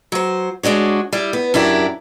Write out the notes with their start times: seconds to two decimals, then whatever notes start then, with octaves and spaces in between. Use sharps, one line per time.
0.12 F#3 C5
0.63 G#3 D4 F#4 C#5
1.13 G3 E4
1.33 B3
1.54 F#2 D4 E4 G4 A#4